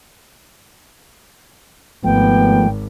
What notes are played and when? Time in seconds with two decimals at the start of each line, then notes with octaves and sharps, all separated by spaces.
2.04 G#1 F3 A3 B3 G5